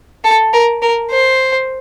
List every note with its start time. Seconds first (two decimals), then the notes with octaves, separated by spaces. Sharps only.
0.24 A4
0.53 A#4
0.82 A#4
1.11 C5